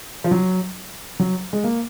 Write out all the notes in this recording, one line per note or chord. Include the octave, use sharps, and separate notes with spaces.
F3
F#3
F#3
G#3
A#3